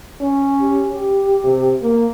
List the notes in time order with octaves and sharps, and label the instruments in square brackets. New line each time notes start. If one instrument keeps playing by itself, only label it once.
[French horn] C#4
[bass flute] G4
G4
[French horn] C3
A#3